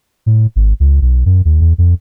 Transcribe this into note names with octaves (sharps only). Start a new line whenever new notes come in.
A2
G#1
C#2
B1
F#2
D#2
E2
F2